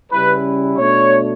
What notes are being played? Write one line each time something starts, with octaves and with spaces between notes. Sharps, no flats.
C#3 G3 C#4 E4 B4
B2 A3 D4 C#5